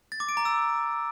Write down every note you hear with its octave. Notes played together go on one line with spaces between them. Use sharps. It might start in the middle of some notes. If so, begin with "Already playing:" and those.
A6
D6
D7
A#5
E6